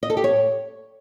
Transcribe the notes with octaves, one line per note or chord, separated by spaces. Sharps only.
D#5
A4
G4
C#5